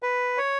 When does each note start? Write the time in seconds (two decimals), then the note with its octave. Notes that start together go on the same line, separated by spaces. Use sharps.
0.03 B4
0.38 C#5